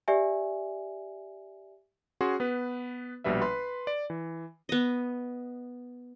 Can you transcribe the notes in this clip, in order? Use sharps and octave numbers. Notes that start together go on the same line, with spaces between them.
G4 D5 E5 G#5
C#4 F#4 G#4 C6
B3 B4
A#1 B2 G3 B4 E5
B4 B5 C6
D5
E3
B3 D#5